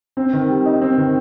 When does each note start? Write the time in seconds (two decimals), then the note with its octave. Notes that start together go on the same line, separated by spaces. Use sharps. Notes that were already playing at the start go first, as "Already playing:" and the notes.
0.17 C4
0.33 D#3
0.49 G3
0.65 D#4
0.82 C4
0.98 D#3